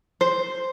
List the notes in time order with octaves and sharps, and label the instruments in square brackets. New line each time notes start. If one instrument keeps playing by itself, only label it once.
[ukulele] C5